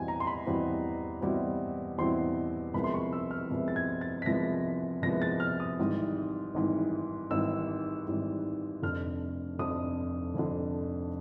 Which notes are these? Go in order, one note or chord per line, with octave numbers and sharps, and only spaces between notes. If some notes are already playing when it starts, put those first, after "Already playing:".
Already playing: E2 B2 G3 C4 E4 G#5
A#5
C6
B5
E2 B2 G3 C4 E4
E2 B2 G3 C4 E4
E2 B2 G3 C4 E4 C6
C2 C3 F3 G#3 B3 B5
C6
C#6
E6
F6
C2 C3 F3 G#3 B3
A6
G#6
A6
B6
C2 C3 F3 G#3 B3 A#6
C2 C3 F3 G#3 B3 A#6
A6
F6
D#6
G#1 G#2 E3 G3
G#1 G#2 E3 G3
G#1 G#2 E3 G3 E6
G#1 G#2 E3 G3
F1 F2 D3 F6
F1 F2 D3 D#6
F1 F2 D3